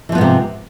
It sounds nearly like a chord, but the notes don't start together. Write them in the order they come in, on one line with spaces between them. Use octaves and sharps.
E3 F3 B3 G#2 C3